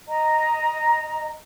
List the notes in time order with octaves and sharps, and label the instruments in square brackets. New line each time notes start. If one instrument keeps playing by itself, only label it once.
[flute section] D#5 A#5